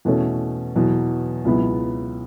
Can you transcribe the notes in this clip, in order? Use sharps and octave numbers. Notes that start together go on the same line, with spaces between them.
E2 B2 A3 C#4
E2 B2 F#3
C#2 B2 F#3 B3 E4